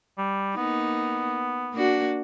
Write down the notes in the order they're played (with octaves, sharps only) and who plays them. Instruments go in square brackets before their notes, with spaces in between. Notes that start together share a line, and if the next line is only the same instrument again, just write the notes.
[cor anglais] G3
[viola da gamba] A#3 D#4 [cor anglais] B3
[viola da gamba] A#3 D4 F#4